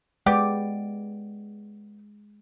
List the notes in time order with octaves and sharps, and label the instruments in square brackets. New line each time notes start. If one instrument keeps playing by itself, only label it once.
[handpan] G#3 [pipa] B3 G4 D5